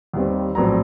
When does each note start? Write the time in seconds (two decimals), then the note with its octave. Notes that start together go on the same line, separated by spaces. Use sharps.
0.13 D#2 D#3 G3 C4
0.55 A#1 A2 F#3 C4 A#5